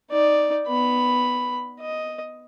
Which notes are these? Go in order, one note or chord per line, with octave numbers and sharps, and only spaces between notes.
D#4 D5
B3 B5
D#5